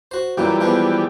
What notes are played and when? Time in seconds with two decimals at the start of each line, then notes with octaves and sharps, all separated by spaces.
0.11 F#4 C5
0.37 F#2 A#2 E3 G3 A#3 G4
0.60 F3 G#3 B3